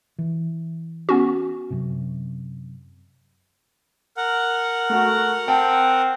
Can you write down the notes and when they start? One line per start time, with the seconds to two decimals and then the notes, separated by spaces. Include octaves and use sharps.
0.18 E3
1.09 B3 C#4 F#4
1.70 F#2 C3
4.17 A#4 F#5
4.90 A3 F#4
5.48 C4 G5 A5